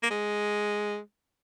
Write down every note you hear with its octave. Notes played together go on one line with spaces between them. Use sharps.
A#3
G#3